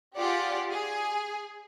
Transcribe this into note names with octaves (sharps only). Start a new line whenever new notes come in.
F4 G4 G#4 D5 F#5
G#4